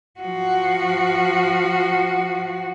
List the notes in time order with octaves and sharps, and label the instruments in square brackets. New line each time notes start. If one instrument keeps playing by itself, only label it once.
[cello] F3 F#4